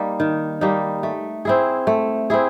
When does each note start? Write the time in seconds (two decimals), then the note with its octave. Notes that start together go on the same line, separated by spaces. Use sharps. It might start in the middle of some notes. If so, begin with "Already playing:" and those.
Already playing: G3 A#3 D#4
0.20 D#3
0.61 G3 A#3 D#4
1.03 A3
1.45 C4 E4 G#4
1.87 A3
2.30 C4 E4 G#4